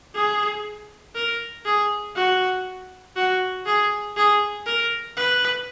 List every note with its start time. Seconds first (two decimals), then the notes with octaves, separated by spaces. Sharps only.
0.15 G#4
1.15 A#4
1.65 G#4
2.16 F#4
3.16 F#4
3.66 G#4
4.17 G#4
4.66 A#4
5.17 B4